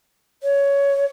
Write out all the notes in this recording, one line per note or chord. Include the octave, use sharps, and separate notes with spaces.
C#5